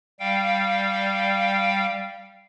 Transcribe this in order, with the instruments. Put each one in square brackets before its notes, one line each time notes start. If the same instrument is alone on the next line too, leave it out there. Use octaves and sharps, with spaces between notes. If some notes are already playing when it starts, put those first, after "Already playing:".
[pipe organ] G3 F5 G5